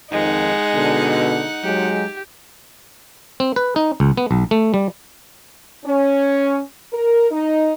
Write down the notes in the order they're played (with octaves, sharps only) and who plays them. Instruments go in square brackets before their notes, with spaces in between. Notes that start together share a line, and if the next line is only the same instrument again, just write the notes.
[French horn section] F2 D#3 [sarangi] G#3 [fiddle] D#4 F#5
[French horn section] B2 D3
[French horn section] F#3 G#3 [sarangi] G4
[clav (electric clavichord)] C4
B4
D#4
C#2
B3
B1
A3
G3
[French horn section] C#4
A#4
D#4